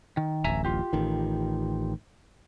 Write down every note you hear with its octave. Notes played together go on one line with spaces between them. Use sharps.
D#3
D1 A1 E5 G#5 A#5
F4 G4
A1 D#3